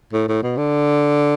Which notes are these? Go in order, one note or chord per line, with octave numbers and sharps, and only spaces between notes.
A2
A2
B2
D3